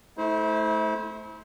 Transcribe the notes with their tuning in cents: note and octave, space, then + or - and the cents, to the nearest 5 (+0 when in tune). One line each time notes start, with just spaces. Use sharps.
A3 -15 E4 -35 C5 +0